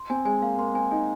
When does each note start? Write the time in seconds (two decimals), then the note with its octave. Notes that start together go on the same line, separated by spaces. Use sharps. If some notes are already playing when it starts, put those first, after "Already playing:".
Already playing: C6
0.10 C4 G#5
0.25 G#3 G#5
0.42 A#3 F5
0.58 A#3 C6
0.74 C4 G#5
0.91 D#4 G#5